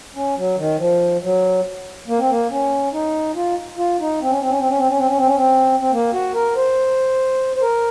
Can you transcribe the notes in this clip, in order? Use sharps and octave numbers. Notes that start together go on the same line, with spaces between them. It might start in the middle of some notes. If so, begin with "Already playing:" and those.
C#4
F#3
D#3
F3
F#3
A#3
C4
A#3
C#4
D#4
F4
F4
D#4
C4
C#4
C4
C#4
C4
C#4
C4
C#4
C4
C#4
C4
C#4
C4
C4
A#3
F#4
A#4
C5
C5
A#4